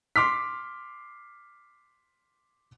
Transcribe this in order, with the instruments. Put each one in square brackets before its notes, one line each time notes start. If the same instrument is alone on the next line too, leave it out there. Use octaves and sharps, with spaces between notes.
[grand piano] C6 D6 F6 B6